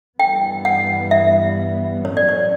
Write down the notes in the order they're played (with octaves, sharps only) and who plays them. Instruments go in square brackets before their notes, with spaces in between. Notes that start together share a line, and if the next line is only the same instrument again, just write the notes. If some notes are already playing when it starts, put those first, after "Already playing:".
[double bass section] G2 E3 G3 B3 [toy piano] G5
[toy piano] F#5
E5
[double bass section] A2 F#3 C#4 [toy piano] C#5
[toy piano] D5
C#5